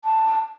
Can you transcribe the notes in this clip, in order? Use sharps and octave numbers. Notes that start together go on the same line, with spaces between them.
A5